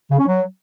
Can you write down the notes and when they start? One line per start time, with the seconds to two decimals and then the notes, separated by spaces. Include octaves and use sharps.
0.10 C#3
0.18 C#4
0.26 F#3